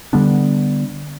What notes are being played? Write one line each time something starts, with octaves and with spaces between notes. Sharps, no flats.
D3 G3 B3 D4